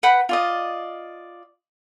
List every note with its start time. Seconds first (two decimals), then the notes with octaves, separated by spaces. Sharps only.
0.03 B4 F#5 G5 B5
0.29 F4 D5 D#5